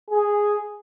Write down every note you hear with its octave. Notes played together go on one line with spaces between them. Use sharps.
G#4